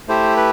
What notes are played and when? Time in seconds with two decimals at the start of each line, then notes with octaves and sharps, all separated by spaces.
0.08 A3 E4 G4 C5
0.37 B4